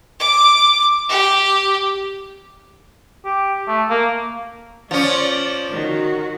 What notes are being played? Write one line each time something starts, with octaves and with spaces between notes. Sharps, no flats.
D6
G4
G4
A3
A#3
F3 C#4 D5
D#3 F#4